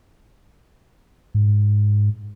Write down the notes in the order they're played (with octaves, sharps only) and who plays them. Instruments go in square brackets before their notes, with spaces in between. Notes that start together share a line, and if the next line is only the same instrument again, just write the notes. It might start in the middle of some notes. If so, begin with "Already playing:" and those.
[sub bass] G#2